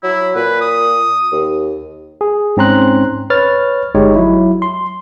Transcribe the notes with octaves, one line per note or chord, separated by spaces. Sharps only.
F#3 E4
A#2 B4
D#6
D#2
G#4
G#2 C4 C#4 A#5 C6 F#6
B4 C#5 F6 A6
G1 G#3 D#4 G4 C#5
F#3 E4
C6